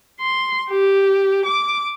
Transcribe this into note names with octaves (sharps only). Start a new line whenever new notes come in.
C6
G4
D6